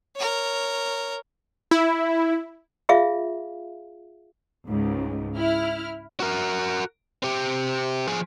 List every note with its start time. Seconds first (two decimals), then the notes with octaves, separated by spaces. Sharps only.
0.16 A#4 C#5
1.71 E4
2.89 F4 G#4 E5 F5
4.68 C#2 G#2
5.36 E4 F6
6.20 F#4 A#4
7.23 C4 G4
8.08 F3 G#4